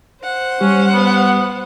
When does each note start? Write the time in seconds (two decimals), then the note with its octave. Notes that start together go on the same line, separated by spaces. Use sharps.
0.22 C5 F#5
0.61 G3 C#4 G4
0.93 B3